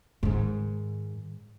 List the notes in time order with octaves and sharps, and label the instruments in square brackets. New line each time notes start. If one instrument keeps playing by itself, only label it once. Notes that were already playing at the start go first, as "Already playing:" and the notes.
[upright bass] G#2 D#3